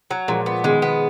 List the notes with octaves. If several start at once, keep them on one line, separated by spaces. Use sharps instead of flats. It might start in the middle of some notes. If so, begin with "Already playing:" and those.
F#3
A#2 F3 G#3
B3
B2 D#3 G#3
B3